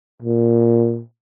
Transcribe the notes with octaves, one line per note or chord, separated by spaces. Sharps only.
A#2